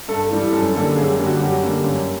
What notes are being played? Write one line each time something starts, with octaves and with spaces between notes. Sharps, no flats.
G2 A4
E3 G3
F#2 A4
D3 G3 A#3 A4
F#2 G#4
G4
D3 G3 A#3
F#4
F#2 G4
D3 G3 A#3
F#2